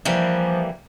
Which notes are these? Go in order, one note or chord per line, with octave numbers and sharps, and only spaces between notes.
E3 F3 G3 A#3